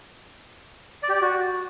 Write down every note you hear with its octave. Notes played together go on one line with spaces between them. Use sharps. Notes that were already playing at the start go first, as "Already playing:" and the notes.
D5
G4
D5
F#4